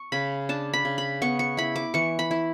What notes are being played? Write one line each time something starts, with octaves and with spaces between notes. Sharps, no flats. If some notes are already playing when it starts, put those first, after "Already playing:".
Already playing: C#6
C#3 B5
D4 A5
B5
C#3
B5
B3 C#6
C#6
E4 B5
D6
E3 C#6
B5
E4